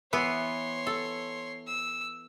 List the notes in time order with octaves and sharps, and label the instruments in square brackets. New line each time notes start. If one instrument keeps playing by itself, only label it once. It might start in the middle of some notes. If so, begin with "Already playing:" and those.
[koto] E3 B3 [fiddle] C#5 C6
[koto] A4
[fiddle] E6